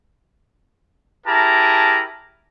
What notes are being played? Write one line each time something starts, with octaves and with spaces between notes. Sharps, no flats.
E4 G4 G#4 A#4 A5 A#5